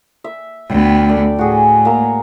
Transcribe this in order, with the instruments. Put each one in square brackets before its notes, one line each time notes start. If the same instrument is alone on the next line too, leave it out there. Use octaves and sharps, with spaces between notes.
[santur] E5
[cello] D2 B3 [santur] G5
[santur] A4 D5
[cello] A2 [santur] F#4 G#4
[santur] A#3 A#5 E6